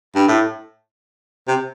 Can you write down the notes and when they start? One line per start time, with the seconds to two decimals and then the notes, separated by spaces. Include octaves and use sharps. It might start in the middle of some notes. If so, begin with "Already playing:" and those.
0.15 G2
0.28 A2
1.48 C3